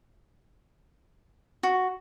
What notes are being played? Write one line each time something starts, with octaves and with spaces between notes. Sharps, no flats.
F#4